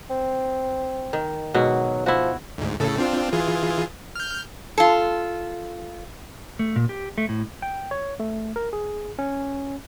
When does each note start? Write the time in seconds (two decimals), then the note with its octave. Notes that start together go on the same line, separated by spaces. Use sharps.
0.10 C4
1.13 D#3
1.54 G#2 B2 F#3 F#4
2.06 F3 E4 F#4
2.58 D2 G#2
2.80 A2 C#3 A4
2.98 C4 D4 F4
3.33 E3 F4 G#4
4.16 F6 G6
4.78 F4 A4
6.59 A3
6.76 A#2
6.89 G4
7.18 A3
7.29 A2
7.62 G5
7.91 C#5
8.20 A3
8.56 A#4
8.73 G#4
9.19 C#4